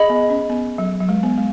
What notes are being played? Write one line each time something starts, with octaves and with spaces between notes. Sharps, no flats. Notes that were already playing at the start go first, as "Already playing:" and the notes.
Already playing: G#4 D#5 B5
B3
C#4
B3
F#3
F#3
G#3
B3
G#3